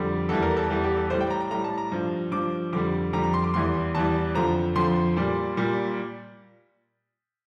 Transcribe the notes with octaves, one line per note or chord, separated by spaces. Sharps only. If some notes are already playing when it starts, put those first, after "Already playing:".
Already playing: F2 D3 G3
E2 E3 G3 A4
A#4
A4
E2 E3 G3 A4
G4
A4
A2 G3 C5
G5
A#5
A#5
A2 G3 A#5
A5
A#5
G2 F3
G2 F3 D6
F2 D3 G3 D6
F2 D3 G3 A#5
A#5
C6
D6
E2 E3 G3 C6
E2 E3 G3 A5
F2 D3 F3 A#5
F2 D3 F3 C6
A#2 G3
A#2 G3